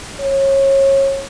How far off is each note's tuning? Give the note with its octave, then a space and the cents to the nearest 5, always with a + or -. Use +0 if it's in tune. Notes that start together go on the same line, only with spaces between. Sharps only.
C#5 -25